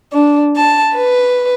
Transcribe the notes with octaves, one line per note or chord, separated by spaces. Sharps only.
D4
A5
B4